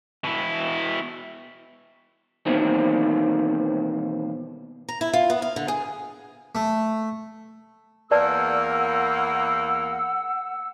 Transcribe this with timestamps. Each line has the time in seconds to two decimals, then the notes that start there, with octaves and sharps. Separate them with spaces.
0.24 B2 E4
2.46 B2 D#3 E3 A#3 C4
4.89 A#5
5.01 E4
5.13 F4
5.30 B3
5.42 F5
5.56 D3
5.68 G#4
6.55 A3
8.11 E2 A#3 B4 D5 F#5 A5 E6